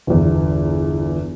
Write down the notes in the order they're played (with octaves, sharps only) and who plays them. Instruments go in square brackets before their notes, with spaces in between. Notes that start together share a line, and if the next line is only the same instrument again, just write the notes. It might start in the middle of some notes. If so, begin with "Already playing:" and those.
[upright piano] G1 E2